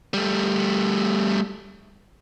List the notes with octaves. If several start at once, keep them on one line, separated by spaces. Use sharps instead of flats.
G3 A3